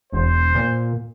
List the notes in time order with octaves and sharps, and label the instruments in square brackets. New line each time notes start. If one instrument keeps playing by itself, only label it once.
[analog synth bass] E1 [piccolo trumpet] C5
[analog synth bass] A#2